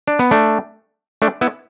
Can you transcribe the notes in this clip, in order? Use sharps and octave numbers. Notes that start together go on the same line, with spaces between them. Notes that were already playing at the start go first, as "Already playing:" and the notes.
D4
B3
A3 D4
A3 D4
B3 E4